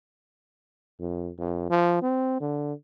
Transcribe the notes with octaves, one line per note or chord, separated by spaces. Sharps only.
F2
F2
F3
C4
D3